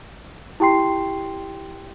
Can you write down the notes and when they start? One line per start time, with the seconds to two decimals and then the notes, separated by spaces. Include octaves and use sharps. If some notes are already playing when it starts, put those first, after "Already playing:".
0.60 E4 G4 G5 C6 C7